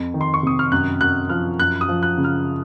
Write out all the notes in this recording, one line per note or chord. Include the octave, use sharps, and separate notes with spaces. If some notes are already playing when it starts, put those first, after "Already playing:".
Already playing: F2
D#3
C6
C#6
C3 D#6
F6
F#2 F#6
F#2 F#6
F3 F6
F#2 F#6
D#6
F3
F#6
C#3
F6